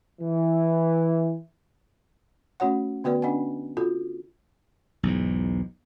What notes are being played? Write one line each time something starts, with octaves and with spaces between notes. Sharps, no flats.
E3
A3 C#4 F#4 C#5 F#5
D3 B3 F#4 B4 D5
C#4 D4 D#5 F#5 G#5
F4 F#4 A4
B1 E2 G#2